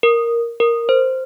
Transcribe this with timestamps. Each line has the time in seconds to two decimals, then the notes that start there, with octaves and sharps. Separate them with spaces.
0.03 A#4
0.60 A#4
0.89 C5